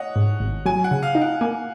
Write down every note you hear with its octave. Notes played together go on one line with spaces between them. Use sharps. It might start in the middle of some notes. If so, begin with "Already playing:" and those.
Already playing: C#5 D#5 F#5
G#2
G#1
F#3 G#5
F#5
C#3
F5
D#4
F#5
A#3 G#5